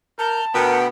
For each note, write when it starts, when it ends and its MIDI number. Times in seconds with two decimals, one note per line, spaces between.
0.19 0.41 70
0.19 0.79 81
0.19 0.45 89
0.19 0.45 91
0.54 0.87 38
0.54 0.87 47
0.54 0.87 59
0.54 0.79 70
0.54 0.87 78
0.54 0.87 79
0.54 0.87 83